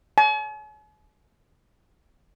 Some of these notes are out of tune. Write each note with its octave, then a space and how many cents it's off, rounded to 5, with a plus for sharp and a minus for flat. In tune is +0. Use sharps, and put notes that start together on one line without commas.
G#5 +45